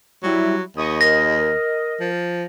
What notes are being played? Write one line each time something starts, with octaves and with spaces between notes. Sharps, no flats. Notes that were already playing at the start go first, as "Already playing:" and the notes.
F#3 G3 E4
D#2 D#5 C#6 D#6
A#4 D#5 A#6
F3